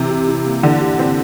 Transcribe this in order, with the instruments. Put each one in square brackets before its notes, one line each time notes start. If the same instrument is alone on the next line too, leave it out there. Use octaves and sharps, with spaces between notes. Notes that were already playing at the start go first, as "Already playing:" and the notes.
Already playing: [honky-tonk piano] C3 [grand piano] E3
[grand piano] G4
E4
A#3
[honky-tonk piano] D3 [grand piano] E3
[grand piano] G4
[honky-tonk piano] C4 [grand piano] E4